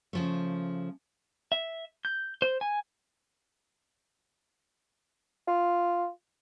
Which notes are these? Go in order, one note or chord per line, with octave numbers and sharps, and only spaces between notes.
C#3 F3 A3
E5
G6
C5
G#5
F4